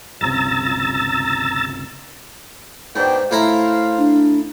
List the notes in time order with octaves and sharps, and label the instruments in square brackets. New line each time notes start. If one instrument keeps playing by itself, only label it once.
[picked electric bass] G1 C#2 C3 [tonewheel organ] A#5 E6 A6
[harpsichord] G#2 [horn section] B2 D4 G5
[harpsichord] A2 E4 A#5 [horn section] C5 F5
[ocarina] D4